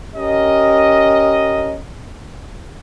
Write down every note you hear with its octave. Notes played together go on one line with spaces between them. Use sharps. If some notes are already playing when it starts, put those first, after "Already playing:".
C#4 G4 A#4 D#5